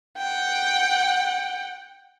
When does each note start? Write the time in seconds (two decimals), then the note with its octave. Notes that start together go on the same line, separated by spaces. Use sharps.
0.18 F#5 G5